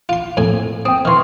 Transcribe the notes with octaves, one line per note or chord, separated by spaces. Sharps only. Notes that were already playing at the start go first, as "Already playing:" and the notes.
F4 C6
F2 A2 G#5
C4 G5 D#6
D#3 E3 C6 C#6 F6